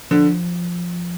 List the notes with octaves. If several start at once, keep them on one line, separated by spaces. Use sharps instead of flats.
D3 F3